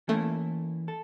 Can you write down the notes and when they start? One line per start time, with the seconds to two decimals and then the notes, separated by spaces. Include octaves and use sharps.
0.08 E3 A3 A#3 C#4 E4 A4
0.88 A4